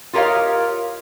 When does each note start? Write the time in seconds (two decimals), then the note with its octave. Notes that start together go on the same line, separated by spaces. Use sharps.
0.13 F4 G4 A#4 C#5 D#5 F5